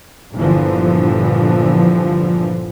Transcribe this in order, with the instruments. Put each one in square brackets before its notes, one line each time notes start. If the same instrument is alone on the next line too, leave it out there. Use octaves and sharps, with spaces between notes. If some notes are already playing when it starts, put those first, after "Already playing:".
[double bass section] G1 A#2 D3 E3 F3